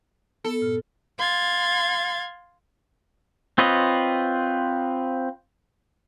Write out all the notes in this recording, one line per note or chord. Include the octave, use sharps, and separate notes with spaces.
B3 A4
G2 A#2 F6
F5 C6 G#6 A6
C4 F4 B4 C#5 D#5